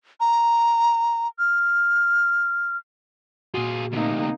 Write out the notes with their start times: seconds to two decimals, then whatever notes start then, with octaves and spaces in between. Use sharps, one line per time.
0.20 A#5
1.39 F6
3.54 A#2 F4 F#4 G#4
3.92 D2 C3 A#3 D#4